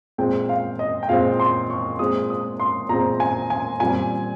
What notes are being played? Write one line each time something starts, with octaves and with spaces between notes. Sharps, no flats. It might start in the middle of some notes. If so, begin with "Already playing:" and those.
A#2 G#3 C4 G5
F5
D#5
G5
A#2 G#3 C4 F5
C6
C#6
A#2 G#3 C4 D#6
D#6
C6
A#2 G#3 C4 A#5
G#5
G#5
A#2 G3 C4 G#5